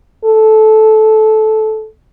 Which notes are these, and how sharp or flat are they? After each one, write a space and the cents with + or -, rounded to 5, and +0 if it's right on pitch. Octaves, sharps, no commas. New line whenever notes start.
A4 -15